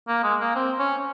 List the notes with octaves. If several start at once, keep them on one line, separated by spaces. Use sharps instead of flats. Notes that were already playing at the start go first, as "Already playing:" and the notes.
A#3
G#3
A#3
C4
C#4